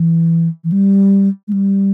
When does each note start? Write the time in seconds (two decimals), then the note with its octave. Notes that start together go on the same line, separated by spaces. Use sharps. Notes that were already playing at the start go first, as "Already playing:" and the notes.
Already playing: E3
0.64 E3
0.72 G3
1.48 G#3
1.53 G3